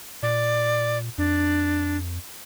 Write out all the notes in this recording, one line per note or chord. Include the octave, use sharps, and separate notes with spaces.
A#2 D5
F2 D4